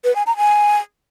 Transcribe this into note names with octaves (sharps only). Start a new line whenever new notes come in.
B4
G#5
A#5
G#5